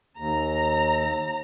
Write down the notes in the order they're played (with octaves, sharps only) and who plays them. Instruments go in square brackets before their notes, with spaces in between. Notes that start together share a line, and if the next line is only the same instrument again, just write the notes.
[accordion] D#2 [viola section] A#5